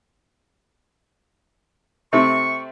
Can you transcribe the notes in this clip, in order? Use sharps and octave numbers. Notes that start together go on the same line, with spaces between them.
C3 A3 C4 C#6